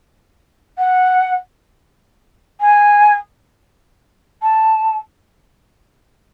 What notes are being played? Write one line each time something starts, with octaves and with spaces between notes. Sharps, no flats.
F#5
G#5
A5